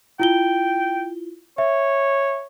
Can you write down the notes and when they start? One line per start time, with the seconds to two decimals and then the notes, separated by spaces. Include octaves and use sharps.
0.20 E4 F4 G5 G7
1.58 C#5 E5